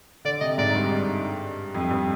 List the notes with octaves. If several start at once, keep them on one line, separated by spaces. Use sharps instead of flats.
D3 D5
C3 D#5
G#2 D5
G2
F2
G2